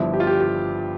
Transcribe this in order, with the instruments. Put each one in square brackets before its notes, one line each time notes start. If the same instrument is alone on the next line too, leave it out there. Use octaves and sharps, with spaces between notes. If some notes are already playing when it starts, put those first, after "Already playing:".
Already playing: [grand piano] G1 G2 F3 E4
G4
F4
G4
G4